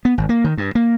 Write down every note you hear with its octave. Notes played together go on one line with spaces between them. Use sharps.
B3
G#1
A#3
D#3
G2
A#3